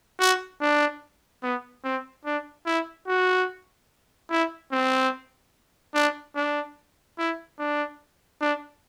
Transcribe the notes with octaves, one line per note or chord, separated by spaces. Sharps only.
F#4
D4
B3
C4
D4
E4
F#4
E4
C4
D4
D4
E4
D4
D4